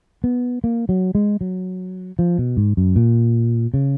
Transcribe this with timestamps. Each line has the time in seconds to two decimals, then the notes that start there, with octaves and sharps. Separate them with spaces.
0.24 B3
0.64 A#3
0.89 F#3
1.15 G#3
1.41 F#3
2.19 F3
2.39 B2
2.57 G#2
2.77 F#2
2.96 A#2
3.74 C#3